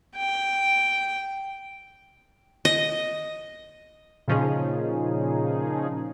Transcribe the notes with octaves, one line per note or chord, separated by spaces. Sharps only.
G5
D#5
A#2 C#3 F3 C#4 D#4 G#4